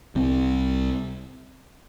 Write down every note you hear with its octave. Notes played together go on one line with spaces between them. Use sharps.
C2 C3 G3 C4